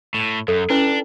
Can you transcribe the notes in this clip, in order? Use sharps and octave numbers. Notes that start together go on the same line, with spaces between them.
A2
F#2 A4
C#4 D4 E4 B4